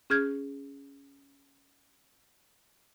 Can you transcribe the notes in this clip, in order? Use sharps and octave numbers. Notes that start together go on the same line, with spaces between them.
C#4 G#4 F6 G6 G#6